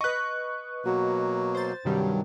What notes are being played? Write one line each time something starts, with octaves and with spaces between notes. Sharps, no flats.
B4 D#5 C#6 F#6
B2 F#3 A#3 F#4
C5 A6
G2 C3 D#3 F#3 G3